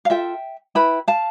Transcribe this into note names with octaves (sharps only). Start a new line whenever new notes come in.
F5
F4 A4 E5 G5
E4 B4 G5 B5
F5 A5